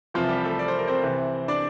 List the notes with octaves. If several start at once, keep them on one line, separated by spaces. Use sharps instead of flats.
C2 C3 E3 F3 F4
G3 G4
A3 A4
D5
C5
A#4
C4 C5
C2 C3 E3
D4 D5